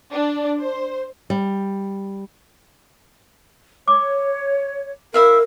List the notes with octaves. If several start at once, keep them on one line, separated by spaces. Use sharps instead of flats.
D4
C5
G3
C#5 D6
E4 A#4 E5 F5